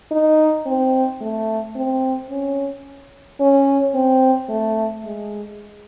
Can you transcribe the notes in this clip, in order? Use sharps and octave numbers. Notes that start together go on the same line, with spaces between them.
D#4
C4
A3
C4
C#4
C#4
C4
A3
G#3